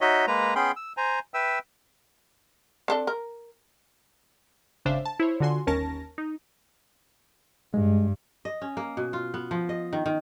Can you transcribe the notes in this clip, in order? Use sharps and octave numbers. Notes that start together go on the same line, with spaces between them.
D#4 F#4 C#5 D#5 E5
G#3 A#3 B4 A#5
B3 C#4 G#4 G5 B5 C6
E6
C5 G#5 A#5
B4 E5 G5 E6
C4 D4 A4
A#4
G#1 C#3 D4 C5 E5 F5
A5
E4 C5 C#5
D3 F4 F#4 G#5 C6
G1 D#2 C#4 A#4 A5 A#6
D#4
G2 G#3
D#5
C#4
A#3
B2
F4
B3
F3
D#5
D#3
D#3